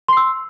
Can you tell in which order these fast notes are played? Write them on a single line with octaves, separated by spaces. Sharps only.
C6 C7 E6